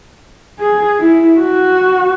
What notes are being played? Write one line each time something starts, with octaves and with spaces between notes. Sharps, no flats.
G#4
E4
F#4